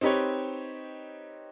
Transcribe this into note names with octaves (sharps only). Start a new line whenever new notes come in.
C4 D#4 G4 B4 C#5